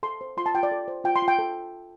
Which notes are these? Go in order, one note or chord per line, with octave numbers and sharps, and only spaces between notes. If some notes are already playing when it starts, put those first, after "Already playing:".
A4 C6
C5
F4 C6
A5
F4 G5
D5
A4
C5
F4 G5
C6
F4
G5
A4